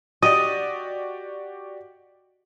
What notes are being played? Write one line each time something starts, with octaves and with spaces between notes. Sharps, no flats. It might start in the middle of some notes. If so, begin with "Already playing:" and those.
F#4 G4 D5 D#5